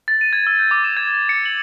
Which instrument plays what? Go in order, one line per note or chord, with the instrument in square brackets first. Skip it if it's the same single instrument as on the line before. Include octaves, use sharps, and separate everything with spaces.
[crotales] A6
D#7
G#6
E6
G6
D6
E7
G#6
A6
C#7
F#7